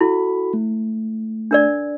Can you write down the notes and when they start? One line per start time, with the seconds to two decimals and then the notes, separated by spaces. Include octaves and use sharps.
0.01 E4 F#4 A4 B5
0.54 A3
1.51 D4 A#4 D5